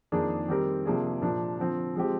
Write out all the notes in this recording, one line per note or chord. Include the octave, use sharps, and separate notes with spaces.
F2 D#3 A#3 D4 G#4
D#3 G3 C4 G4 A#4
C3 F3 A#3 D4 G#4
A#2 F3 A#3 D4
D3 F3 C4
F3 G#3 C4 G4